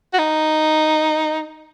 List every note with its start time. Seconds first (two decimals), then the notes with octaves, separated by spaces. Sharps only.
0.13 F#4
0.18 D#4